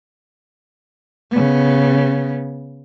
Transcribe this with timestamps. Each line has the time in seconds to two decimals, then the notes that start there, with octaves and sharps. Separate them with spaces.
1.31 C#3 B3